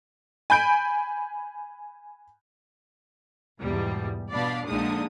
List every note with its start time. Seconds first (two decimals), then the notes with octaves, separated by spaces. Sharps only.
0.50 G#5 B5 G6 D7
3.60 E2 G#2 B2 G3
4.32 B2 D4 D5 F5 B5
4.67 A#1 A#2 D3 G#3 D#4 D#6